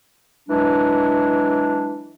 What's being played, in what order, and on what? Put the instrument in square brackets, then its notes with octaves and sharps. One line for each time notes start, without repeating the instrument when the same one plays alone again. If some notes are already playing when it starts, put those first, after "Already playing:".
[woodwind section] E3 F#3 G#3 D4